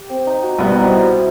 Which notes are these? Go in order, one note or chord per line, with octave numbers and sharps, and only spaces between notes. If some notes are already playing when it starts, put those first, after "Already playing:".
Already playing: G4
C4
D#4
F#4
C2 B2 G3 B3 E4
D#4
C4
E4